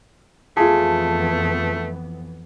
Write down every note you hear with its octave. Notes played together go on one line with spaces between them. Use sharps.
F2 E3 A3 B3 F4 G#4 A5